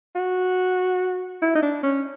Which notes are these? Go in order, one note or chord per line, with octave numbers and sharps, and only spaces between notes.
F#4
E4
D#4
D4
C#4